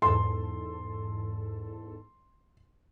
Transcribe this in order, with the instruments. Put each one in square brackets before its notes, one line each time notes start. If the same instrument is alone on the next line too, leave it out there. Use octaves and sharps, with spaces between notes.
[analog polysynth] E2 G#2 A4 [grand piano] C6